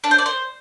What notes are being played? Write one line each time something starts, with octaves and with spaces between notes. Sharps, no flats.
D4
C5
D5
C5